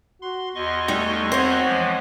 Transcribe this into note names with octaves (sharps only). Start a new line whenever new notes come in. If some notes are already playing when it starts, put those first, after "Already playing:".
F#4 C6
E2 F#4 D#5 C6 C#6
G3 A3 D#4
C4 F#4 C5 C#5 F#5
E3 F3 G#3